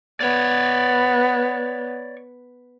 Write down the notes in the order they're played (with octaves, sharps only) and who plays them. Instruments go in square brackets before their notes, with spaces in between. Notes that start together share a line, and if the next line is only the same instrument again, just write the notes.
[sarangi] B3 [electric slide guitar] C#5 D5